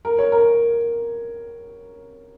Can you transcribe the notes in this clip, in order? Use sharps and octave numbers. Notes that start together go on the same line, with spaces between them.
A#4
C#5
A#4